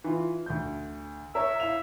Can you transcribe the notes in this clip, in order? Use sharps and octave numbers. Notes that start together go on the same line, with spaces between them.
E3 F4
D2 G6
A#4 C#5 E5
E4 F5 F7